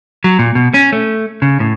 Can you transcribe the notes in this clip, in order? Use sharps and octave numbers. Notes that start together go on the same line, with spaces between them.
F#3
A#2
B2
C#4
A3
C#3
A2